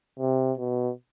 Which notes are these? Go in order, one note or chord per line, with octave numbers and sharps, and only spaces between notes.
C3
B2